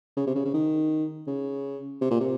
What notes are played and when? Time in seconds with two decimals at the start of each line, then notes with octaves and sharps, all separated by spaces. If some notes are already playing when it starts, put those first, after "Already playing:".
0.17 C#3
0.27 C3
0.35 C#3
0.45 C#3
0.54 D#3
1.27 C#3
2.01 C3
2.10 A#2
2.20 C3